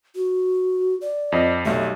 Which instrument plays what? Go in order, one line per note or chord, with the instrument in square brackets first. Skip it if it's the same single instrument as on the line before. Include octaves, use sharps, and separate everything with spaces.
[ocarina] F#4
D5
[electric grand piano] F2 D#5
[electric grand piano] B1 G3 A3 [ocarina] E5